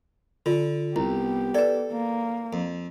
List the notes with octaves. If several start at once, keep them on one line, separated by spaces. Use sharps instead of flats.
D3 F4
C2 B3 E4 G4
A4 B4 D5
A#3
F2